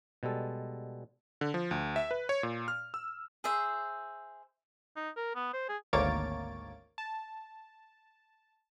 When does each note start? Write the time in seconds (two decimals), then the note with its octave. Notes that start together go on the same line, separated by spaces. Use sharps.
0.23 B2 G3 G#3 A4
1.41 D3
1.54 F3
1.71 D2
1.96 E5
2.11 B4
2.29 C#5
2.43 A#2
2.68 F6
2.94 E6
3.44 G#4 C5 E5
4.96 D#4
5.16 A#4
5.35 B3
5.53 C5
5.69 G#4
5.93 G#1 D2 A#3 C#5 A6 D7
6.98 A5